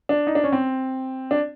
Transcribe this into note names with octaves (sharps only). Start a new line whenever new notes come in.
D4
D#4
D4
C#4
C4
D4